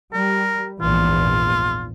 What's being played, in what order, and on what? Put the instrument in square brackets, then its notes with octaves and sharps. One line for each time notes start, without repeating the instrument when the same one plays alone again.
[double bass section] G3 [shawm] A#4
[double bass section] A#1 E2 G#2 [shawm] F4